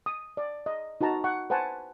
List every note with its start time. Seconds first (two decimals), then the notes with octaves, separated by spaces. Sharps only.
0.06 D#6
0.37 D5
0.66 D#5
1.01 D#4 F#4 B4 A5 A#5
1.24 F#5 C#6
1.50 B4 C5 F#5 G#5 A5